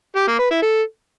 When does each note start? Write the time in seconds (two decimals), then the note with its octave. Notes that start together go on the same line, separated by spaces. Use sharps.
0.16 G4
0.28 A#3
0.39 B4
0.51 E4
0.62 A4